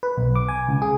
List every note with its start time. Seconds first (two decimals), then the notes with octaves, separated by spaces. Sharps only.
0.03 B4
0.17 B1
0.35 D6
0.49 G#5
0.68 C#2
0.82 G#4